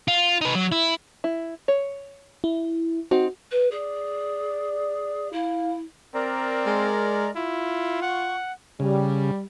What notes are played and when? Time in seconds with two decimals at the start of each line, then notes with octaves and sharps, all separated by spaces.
0.08 F4
0.41 D#4 B4
0.55 F#3
0.72 E4
1.24 E4
1.68 C#5
2.44 E4
3.11 C4 D#4 F#4
3.51 B4
3.71 G#4 D5
5.32 E4 F5
6.15 C4 A#4 D5 A#5
6.67 G#3
7.36 E4 F4
8.02 F#5 C#6
8.80 C#3 G3